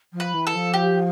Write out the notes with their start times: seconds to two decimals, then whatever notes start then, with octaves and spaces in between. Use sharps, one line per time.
0.12 F3
0.20 B4
0.33 E3
0.47 A4
0.54 F3
0.74 G4